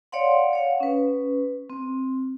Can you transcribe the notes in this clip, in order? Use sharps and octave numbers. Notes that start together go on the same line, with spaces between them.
C#5 D5 F5 F#5 C6
C#5 F5 F#5
C#4 B4
C4